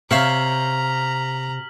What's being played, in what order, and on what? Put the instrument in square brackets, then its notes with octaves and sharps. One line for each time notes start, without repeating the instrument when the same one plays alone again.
[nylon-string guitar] C3 [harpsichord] C#5 E5 F5 [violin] A#5 [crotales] F6 B6 F#7